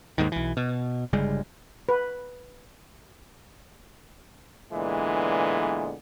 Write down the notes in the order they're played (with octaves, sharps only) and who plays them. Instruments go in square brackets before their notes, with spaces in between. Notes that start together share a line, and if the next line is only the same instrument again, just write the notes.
[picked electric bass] D#2 G#2 D#3
B1 E3
B2
G1 C#3 G3 G#3
[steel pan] B4
[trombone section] A#2 D3 E3 G#3 B3